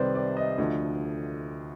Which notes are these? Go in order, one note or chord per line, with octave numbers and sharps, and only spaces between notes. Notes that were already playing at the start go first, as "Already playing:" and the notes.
Already playing: C2 C3 D#3 G3 B4 C5 D5
D5
D#5
D2 D3 F3